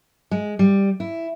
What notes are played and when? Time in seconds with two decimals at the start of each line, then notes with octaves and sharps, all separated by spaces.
0.31 G#3
0.59 G3
1.00 E4